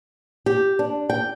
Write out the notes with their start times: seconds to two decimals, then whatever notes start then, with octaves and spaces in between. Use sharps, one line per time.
0.46 G4
0.79 D4
1.10 G5